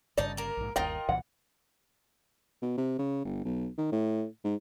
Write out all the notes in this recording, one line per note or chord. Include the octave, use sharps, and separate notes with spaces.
G1 G2 C#3 D#4 D5 A5
A#3 A#4
A#1 G#2
G1 D#2 F4 A#4 D#5 G5
C2 A#2 E3 F#5
B2
C3
C#3
G1
B1
D#3
A2
G#2